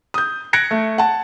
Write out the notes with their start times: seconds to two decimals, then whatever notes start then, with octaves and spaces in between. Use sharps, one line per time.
0.14 D#6 G6
0.53 F#6 G#6 A#6 C#7 D7
0.71 A3
0.98 F#5 A5